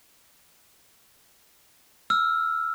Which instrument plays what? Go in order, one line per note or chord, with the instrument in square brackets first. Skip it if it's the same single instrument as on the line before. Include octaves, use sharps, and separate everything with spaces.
[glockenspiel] E6 F6